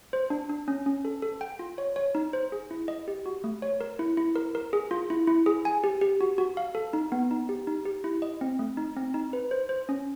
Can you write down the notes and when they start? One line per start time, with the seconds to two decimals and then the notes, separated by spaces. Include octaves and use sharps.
0.13 C5
0.30 D4
0.49 D4
0.68 C#4
0.86 C#4
1.05 A4
1.22 A4
1.41 G5
1.59 F4
1.78 C#5
1.96 C#5
2.15 D#4
2.33 C5
2.52 G#4
2.71 E4
2.88 D#5
3.08 G4
3.26 F#4
3.44 A3
3.62 C#5
3.81 A#4
3.99 E4
4.17 E4
4.36 A#4
4.55 A#4
4.73 G#4
4.91 F4
5.10 E4
5.27 E4
5.46 G#4
5.65 G#5
5.84 G4
6.01 G4
6.21 F#4
6.38 F#4
6.57 F5
6.75 A4
6.93 D#4
7.12 B3
7.31 D#4
7.49 G4
7.67 D#4
7.85 G4
8.04 E4
8.22 D#5
8.41 C4
8.59 A3
8.77 D#4
8.97 C4
9.14 D#4
9.33 B4
9.51 C5
9.69 C5
9.89 C#4